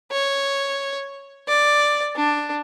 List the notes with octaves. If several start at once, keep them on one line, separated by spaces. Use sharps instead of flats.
C#5
D5
D4